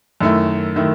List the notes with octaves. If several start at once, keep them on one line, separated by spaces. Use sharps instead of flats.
F#2 D#3 A3 E4
D#3 A3 E4